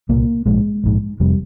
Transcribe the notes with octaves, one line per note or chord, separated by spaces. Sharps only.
C2 A#2 A#3
A#1 G#2 G#3
A#1 G#2
F1 F2 C3 G3